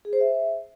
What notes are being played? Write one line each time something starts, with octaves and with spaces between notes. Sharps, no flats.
G#4
C5
E5